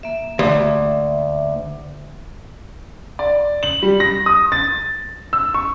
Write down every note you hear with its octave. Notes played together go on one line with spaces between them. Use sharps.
A#3 E5
D2
D5
F#7
G3
A#6
D#6
A6
E6
C#6